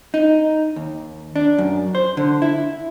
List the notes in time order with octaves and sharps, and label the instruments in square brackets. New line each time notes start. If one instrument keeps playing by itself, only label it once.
[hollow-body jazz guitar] D#4
D#2
D4
F#2
C5
D3
E4